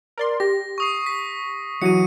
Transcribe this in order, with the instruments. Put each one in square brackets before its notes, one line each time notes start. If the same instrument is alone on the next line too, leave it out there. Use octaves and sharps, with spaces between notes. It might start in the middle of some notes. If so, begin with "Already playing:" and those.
[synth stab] A#4 D5 C6
[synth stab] G4 [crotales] A#6
[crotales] C#6 D#6 C7
B6
[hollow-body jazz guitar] E3 F#3 F#4 [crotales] C#7 D#7